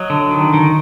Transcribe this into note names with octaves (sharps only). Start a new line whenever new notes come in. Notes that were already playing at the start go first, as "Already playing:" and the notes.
Already playing: F#3 D#5
D3
D#3
D#3